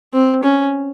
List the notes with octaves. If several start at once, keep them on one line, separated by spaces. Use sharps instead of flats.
C4
C#4